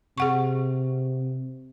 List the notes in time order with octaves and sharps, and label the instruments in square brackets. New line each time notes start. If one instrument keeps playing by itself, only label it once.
[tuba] C3 [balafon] G#4 F#5 C#6